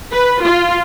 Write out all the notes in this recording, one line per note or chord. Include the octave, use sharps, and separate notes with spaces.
B4
F4